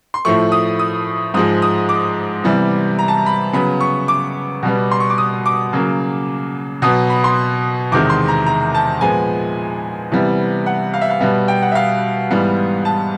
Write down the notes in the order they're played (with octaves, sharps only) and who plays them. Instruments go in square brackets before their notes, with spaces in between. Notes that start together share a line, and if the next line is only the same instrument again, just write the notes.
[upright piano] C6
A2 F3 A3 C#6
D#6
D#6
G#2 F3 G#3 D#6
D#6
D6
C3 E3 G3 B3
A#5
A5
A#5
B5
C#3 F#3 B3 B5
C#6
D6
B2 G3 B3
C6
C#6
D6
D#6
D6
C#3 F#3 A#3
B2 F#3 B3 D#6
B5
C6
E2 C3 D#3 G#3 D6
C6
A#5
A#5
A5
A#2 F3 G#3 B3 G#5
C3 E3 G3 B3
F#5
F5
E5
F5
B2 G3 B3 E5
G5
F#5
E5
F5
G#2 E3 G3 B3
A5